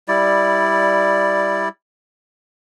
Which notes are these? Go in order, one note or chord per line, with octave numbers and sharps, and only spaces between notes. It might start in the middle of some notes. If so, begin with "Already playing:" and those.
G3 E4 D5